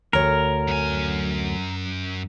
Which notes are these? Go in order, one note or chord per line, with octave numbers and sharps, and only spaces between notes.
D2 A#4 C#5
F#2 G#5